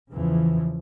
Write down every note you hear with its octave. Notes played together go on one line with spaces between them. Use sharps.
E2 C#3 E3 F3